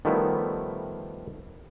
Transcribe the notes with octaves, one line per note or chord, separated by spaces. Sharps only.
D#3 F3 G3 A3 B3 E4